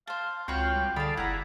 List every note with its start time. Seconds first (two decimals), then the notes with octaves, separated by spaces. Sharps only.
0.07 C5 F5 A5
0.48 C#2 C4 F4 F#4 B4 C#5 G5
0.75 G3
0.96 D3 G#4 A4 D5 F5 A5 B5
1.17 F#1 E4 G#4 F#5 A#5 B5